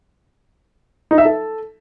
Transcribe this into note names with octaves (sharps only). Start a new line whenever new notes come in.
D#4
E5
A4